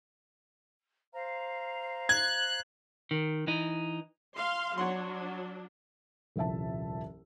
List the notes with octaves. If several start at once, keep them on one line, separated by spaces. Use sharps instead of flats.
C5 F5 A#5
F#6 G#6
D#3
E3 D#4
F5 C6
F#3 D4 C#5 F#5 C6
D#1 C2 F3 E5 A5